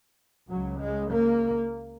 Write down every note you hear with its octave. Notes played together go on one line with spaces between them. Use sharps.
C#2 C#3 F#3
G#3
A#3